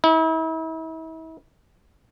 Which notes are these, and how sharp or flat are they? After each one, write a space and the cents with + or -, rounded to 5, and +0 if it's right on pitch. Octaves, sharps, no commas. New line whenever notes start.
E4 -40